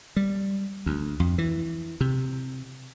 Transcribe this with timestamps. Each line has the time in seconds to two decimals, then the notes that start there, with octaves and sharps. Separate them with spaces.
0.16 G3
0.86 D2
1.20 F2
1.38 E3
2.01 C3